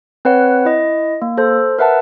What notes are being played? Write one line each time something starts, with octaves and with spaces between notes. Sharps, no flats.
C4 B4 C#5 F#5
E4 D#5
A#3
A4 C5
A#4 B4 E5 F#5 A5